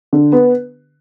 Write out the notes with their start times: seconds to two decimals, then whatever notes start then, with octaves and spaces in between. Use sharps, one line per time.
0.13 D3
0.32 B3